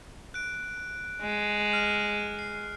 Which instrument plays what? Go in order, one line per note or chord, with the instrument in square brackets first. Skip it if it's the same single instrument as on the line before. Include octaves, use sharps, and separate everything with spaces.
[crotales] F#6 D7
[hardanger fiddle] G#3
[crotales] F6
C7